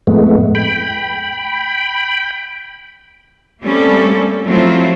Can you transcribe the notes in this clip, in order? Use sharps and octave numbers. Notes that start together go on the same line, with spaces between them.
F2 A2 G#3 A3 B3
G5 B5
G3 A3 A#3 C4 C#4 A4
F3 F#3 A3 C4 E4 F4